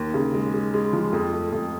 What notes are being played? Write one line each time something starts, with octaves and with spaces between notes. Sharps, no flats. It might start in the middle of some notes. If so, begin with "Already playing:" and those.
Already playing: D#2
C#3
G#3
G#3
G#3
F3
F2
A3
F2